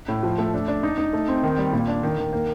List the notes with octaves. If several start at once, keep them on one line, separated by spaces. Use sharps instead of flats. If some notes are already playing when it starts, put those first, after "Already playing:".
A2
F3
A3
D4
D4
D#4
D#4
A3
C4
D#3
G3
A#2
D4
D#3
D#3
A#3